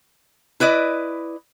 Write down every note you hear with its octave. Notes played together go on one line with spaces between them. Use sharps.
E4 B4 D5 D#5